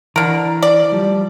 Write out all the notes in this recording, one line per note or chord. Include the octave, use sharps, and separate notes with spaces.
D3 E3 A#4
D5
F3 G3